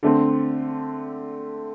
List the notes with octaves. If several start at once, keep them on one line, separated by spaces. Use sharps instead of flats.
D3 A3 C4